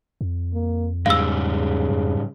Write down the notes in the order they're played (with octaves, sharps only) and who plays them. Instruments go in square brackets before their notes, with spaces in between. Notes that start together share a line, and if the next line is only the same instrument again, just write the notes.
[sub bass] F2
[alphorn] A#3
[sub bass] E2 [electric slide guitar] G#2 G3 G#3 [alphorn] C#3 [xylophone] F5 E6
[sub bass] F2